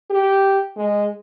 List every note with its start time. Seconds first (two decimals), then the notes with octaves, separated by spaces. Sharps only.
0.11 G4
0.76 G#3